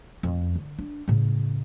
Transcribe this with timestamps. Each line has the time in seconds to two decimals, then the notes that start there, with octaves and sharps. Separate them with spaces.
0.23 F2
0.55 D3
0.79 D4
1.08 A2 C#3